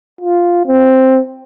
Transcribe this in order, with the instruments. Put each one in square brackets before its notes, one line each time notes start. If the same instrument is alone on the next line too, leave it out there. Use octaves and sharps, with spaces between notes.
[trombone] F4
C4